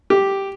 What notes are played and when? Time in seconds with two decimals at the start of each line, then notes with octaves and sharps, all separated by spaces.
0.10 G4